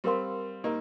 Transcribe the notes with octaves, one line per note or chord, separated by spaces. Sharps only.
G3 C4 G4 A#4 F5 C6
A#3 D#4 G4 A#4